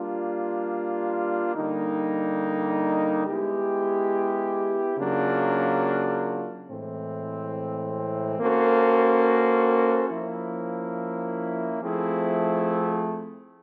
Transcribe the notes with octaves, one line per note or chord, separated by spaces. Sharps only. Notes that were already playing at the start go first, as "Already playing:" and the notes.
Already playing: G3 A#3 D4 F4
D3 G3 A#3 D#4
G#3 B3 E4 G4
C#3 F#3 A#3 D4 F4
A2 E3 G#3 C4
A#3 C#4 F#4 A4 C5
F3 A#3 C#4 E4
F3 A3 C4 E4 G#4